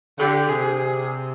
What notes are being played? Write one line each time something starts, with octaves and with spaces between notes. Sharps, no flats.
D3 G4
C3 G#4